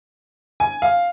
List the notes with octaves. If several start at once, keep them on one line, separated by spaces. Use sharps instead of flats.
G#5
F5